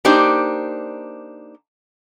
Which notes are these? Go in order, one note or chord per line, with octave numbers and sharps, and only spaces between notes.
A#3 D4 D#4 G4 C5